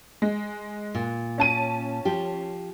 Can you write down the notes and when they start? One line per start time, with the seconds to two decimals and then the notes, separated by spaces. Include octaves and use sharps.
0.22 G#3
0.95 A#2
1.38 C#4 A5 D#7
2.05 F3 G4